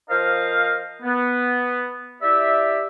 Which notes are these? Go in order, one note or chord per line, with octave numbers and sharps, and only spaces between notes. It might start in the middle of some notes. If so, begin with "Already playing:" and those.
F3 A#4 C5 D#5 F5
B3
E4 G4 D5 E5